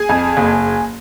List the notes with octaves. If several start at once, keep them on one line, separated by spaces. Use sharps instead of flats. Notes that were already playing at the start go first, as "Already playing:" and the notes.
Already playing: G#4 G#5
F2
F#1